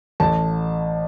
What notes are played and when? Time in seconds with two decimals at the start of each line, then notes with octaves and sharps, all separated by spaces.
0.20 A1 A5